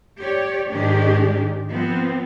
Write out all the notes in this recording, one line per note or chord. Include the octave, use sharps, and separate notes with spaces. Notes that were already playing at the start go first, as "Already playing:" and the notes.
G4 C#5 D5
G#2 D#3 D4 G4 G#4
F3 B3 C4